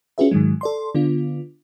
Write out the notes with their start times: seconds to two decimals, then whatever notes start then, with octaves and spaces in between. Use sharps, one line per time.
0.18 C#4 F4 F#4 G#4 B4 E5
0.31 G#2 D#3 F#3 G#3
0.61 A4 D5 C6
0.95 D3 B3 D4 F4